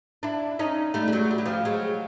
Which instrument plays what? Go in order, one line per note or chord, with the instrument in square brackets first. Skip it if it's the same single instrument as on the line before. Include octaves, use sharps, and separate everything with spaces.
[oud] D4 E4
C#4 D#4
G3 A3
G3
F#3 G#3
G3
F#3
F3 G3
F#3 G#3